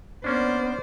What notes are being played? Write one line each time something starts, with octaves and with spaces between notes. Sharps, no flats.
A#3 B3 C#4 D4 C5 D5